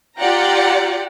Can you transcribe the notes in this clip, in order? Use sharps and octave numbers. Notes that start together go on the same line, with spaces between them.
F4 G4 D5 F#5 G5 A#5